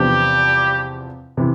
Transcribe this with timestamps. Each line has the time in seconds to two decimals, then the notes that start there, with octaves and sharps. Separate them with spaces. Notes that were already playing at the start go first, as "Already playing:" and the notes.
Already playing: E2 C3 F3 G3 B3 D4 G4
1.37 C3 E3